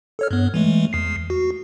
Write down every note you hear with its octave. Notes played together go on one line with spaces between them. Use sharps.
A4 C#5 F6
G2 B3
E3 G#3 A3
E2 C7
F#4